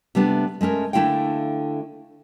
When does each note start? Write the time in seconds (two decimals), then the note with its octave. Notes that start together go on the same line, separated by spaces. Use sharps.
0.15 C3 G3 A3 B3 D4
0.61 G#3 A3 C#4 A#4
0.93 D3 A3 E4 F#4 F5 G5